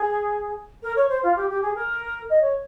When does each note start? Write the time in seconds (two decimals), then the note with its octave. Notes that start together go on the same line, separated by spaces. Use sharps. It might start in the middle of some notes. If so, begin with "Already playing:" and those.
Already playing: G#4
0.83 A#4
0.96 C#5
1.09 C5
1.23 F4
1.36 G4
1.49 G4
1.62 G#4
1.75 A#4
2.30 D#5
2.41 C#5